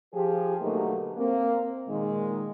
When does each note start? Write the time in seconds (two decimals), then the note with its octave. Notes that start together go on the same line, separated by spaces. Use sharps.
0.13 F3 G4 G#4
0.61 B2 D3 F#3 A3 A#3 D#4
1.17 A#3 C4
1.88 A#2 D#3 G#3